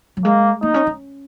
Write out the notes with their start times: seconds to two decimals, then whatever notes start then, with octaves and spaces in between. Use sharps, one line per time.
0.17 F#3
0.25 G#3 A#3
0.62 A#3 D#4
0.74 C#4
0.87 C#4